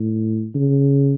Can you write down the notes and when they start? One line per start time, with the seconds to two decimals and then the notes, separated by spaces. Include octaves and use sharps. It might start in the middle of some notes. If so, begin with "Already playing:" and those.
Already playing: A2
0.55 C#3